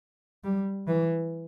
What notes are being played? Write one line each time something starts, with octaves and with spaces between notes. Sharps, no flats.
G3
E3